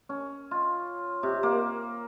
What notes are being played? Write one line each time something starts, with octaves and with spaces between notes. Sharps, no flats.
C#4
F4
C3
A#3